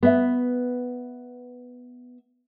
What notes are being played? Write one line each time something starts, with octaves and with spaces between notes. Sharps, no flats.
B3 E5